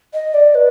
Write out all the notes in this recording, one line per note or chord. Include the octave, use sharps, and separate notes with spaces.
D#5
D5
B4